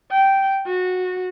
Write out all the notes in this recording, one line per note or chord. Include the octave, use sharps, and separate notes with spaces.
G5
F#4